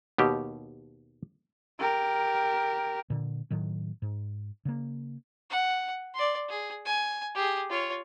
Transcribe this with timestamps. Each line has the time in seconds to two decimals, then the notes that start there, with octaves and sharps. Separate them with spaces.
0.18 D#2 B2 G4
1.79 G4 A#4
3.10 A#2 D3
3.51 A2 D#3 F#3
4.02 G#2
4.65 C#3 A#3
5.50 F#5
6.14 D5 C6
6.49 G#4
6.85 G#5
7.35 G4 G#4
7.70 F4 C#5